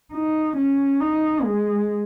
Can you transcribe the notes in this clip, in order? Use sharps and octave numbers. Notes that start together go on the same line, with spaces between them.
D#4
C#4
D#4
G#3